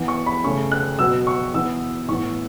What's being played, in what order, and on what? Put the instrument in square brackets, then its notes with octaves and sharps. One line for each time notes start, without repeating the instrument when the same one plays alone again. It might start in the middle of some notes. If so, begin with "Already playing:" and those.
Already playing: [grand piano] E3 B3
C#6
B5
C#3 A3 C#4 C#6
F#6
B2 F#3 B3 E6
C#6
E3 B3 E6
A2 E3 B3 C#6